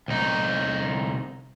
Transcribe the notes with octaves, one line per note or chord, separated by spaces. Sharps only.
C2 D#4